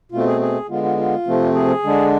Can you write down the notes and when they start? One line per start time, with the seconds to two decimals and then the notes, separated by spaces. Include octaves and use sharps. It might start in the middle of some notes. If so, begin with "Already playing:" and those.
0.12 B2 A3 C4 F4
0.26 G#4
0.41 G#4
0.69 D3 G#3 B3 F4
0.84 F4
0.97 F4
1.26 C3 F3 A3 C4
1.55 G#4
1.83 D3 G#3 D4